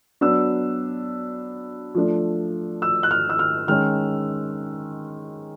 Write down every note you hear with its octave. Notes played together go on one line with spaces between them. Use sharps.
F#3 B3 D4 E6
F3 A3 D4
E6
F#6
F6
E6
F6
D#3 G#3 C#4 F6